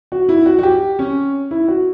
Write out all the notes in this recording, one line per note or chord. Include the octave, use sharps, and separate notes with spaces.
F#4
E4
F#4
F#4
G4
C#4
E4
F#4